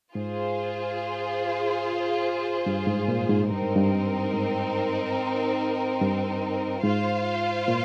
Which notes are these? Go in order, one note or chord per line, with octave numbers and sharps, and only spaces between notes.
G#2 F4 G#4 C5
G2
G#2
A#2
G#2
G2 C4 D#4 A#4
G#2
G2
G#2
G2
G#2 F4 C5 F5
A#2